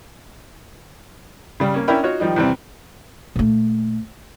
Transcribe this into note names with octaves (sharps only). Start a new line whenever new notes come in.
C#3 G3
A#3 C#4
C#4 D4 E4 A#4 G5 B5
D#4 F4 F#4 C#5
D#3 F3 G3 D#4
E2 C3 G3 C4
A#2 A3